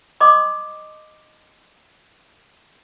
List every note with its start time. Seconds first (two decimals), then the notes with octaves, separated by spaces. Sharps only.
0.20 D#5 C6 D6 D#6